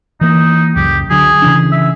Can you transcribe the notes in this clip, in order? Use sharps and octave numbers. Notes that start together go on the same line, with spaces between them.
E3 A#3 D#4
C#2 F#2 G4
D3 F#3 G#4
C#3 E3 D4
E5